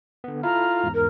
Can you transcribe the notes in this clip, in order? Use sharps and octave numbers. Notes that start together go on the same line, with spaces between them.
D3 B3
E4 F4 A4 A#5 F6
E2 G#2
A#4